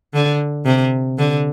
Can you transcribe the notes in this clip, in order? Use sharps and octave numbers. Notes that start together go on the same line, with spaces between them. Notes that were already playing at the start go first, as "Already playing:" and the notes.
D3
C3
D3